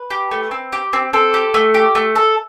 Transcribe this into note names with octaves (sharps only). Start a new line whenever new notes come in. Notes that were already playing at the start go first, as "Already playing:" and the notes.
Already playing: B4
G4
A3
C4
G4
C4
C4 A4
G4
A3
G4
A3
A4